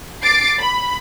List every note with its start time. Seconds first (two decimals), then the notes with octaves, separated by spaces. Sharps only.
0.23 D6 A6 C7 D7
0.59 B5